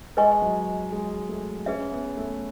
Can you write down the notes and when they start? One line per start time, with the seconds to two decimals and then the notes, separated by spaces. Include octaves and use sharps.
0.17 G#3 B4 D#5 G#5 C#6
0.42 F#3
0.92 G#3
1.29 A3
1.66 C#4 G#4 B4 E5
1.92 B3
2.17 A3